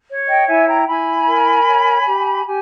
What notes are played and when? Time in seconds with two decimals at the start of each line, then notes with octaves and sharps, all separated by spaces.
0.08 C#5
0.28 D#5 G5
0.48 E4 E5 G#5
0.67 G5 A#5
0.87 E4 G#5 B5
1.27 A#4
1.67 C#5
2.07 G4
2.46 G4 G#5